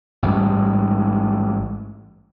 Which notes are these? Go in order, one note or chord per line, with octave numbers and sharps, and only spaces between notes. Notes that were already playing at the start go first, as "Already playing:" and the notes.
A1 G#2 G3